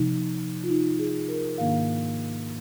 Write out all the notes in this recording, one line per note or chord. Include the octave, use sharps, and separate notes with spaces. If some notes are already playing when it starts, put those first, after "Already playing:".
Already playing: C3 F3 A#3 D#4
F4
D#4
G#4
A#4
G#2 D#3 A#3 D4 F5